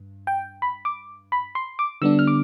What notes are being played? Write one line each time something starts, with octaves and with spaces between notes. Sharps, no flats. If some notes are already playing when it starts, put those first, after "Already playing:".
Already playing: G2
G5
B5
D6
B5
C6
D6
D3 G3 B3 D4 E6
F6
D6